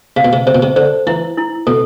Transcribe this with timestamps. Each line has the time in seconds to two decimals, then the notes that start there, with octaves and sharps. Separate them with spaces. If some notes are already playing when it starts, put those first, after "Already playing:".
0.17 C3 F5
0.25 B2
0.33 C3
0.47 C3 C5
0.55 B2
0.62 C3
0.76 D3 C5
1.07 E3 E4
1.38 E4
1.67 B2 A4